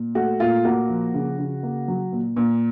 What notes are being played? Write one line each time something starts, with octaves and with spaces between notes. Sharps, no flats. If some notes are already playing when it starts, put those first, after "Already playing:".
Already playing: A#2
A3 F#4
A#2 F4
A#3 F#4
F3
C#3
C#3
A#3
F#3
A#2
A#2